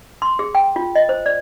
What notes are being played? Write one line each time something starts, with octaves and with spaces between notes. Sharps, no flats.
C6
G#4
G5
F4
D#5
C5
D5